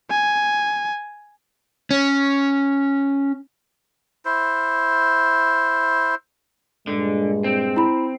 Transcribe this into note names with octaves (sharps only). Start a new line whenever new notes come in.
G#5
C#4
E4 C5
G2 A#2 D3 G#3
C4
E4 B5